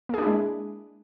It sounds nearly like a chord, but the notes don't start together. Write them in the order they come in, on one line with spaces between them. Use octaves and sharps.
A#3 G#4 D4 E4 G#3